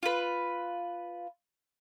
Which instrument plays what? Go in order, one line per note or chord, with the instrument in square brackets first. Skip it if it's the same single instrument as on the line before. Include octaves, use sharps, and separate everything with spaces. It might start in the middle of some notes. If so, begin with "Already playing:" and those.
[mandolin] F4 B4